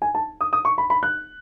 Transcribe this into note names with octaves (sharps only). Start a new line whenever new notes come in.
G#5
A5
D#6
D#6
C#6
B5
B5
F#6